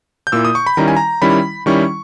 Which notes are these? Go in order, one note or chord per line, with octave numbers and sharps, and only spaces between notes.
G6
A#2 A#3 E4 E6
D#6
C#6
B5
D#3 G3 C#4 E4 A#5
G#5
A#5
D#3 G3 C#4 E4 B5
D#3 G3 C#4 E4 C#6